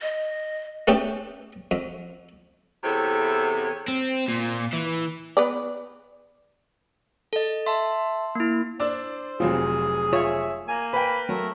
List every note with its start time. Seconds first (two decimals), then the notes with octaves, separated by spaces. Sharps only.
0.01 D#5
0.87 A3 B3 C#4 D4 G4 G5
1.71 F2
2.83 E2 C3 C4 E4 A4 C#5
3.88 C4
4.28 A#2
4.73 E3
5.37 B3 B4 D5
7.33 A4 D#5
7.66 E5 A5 C6
8.35 A#3 E4
8.80 D4 C5 D5 E6
9.40 F1 F#3 C4 F4 G#4
10.13 F4 C#5 E5
10.68 A#3 G#5
10.93 B4 G5 B5
11.29 F#3 A3 A#4